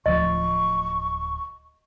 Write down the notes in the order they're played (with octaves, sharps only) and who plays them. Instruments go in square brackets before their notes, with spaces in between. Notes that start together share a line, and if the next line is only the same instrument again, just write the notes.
[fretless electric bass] D1 D2 F3 [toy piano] D#5 [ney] C#6